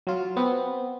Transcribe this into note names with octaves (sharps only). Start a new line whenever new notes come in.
F#3 F4
B3 C4